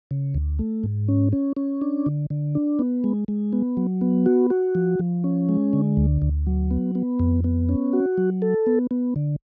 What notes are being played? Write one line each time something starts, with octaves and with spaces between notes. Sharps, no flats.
C#3
D2
A3
G#2
C#4
C#4
C#4
D4
D3
D3
D4
B3
G#3
G#3
B3
F#3
B3
F#4
F#4
F3
F3
C#4
G#3
D3
D2
D2
F#3
B3
B3
F2
B3
C#4
F#4
F#3
A4
B3
B3
D3